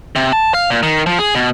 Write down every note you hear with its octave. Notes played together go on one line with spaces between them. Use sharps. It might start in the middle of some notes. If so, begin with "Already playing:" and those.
C3
A5
F5
A#2
D#3
F3
G#4
B2